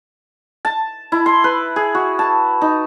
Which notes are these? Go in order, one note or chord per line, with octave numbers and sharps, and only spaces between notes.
A5
E4
C6
B4
G#4
F#4
A5
D#4